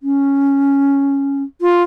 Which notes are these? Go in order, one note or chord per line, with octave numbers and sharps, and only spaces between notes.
C#4
F4